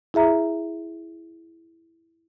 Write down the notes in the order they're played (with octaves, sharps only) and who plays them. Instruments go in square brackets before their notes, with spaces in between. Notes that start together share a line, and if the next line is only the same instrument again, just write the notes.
[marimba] E4 G#4 E5 A#5